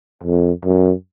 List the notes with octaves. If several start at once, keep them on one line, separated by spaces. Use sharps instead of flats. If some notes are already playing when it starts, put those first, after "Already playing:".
F2
F#2